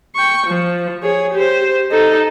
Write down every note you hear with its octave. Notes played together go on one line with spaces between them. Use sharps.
G5 C#6
F3
G#4 C#5
G4 C5
D#4 A4